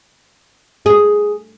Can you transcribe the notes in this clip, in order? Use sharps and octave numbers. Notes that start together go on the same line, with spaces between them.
G#4